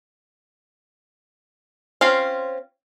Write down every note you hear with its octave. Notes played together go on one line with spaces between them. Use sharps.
C4 C#4 F4 F5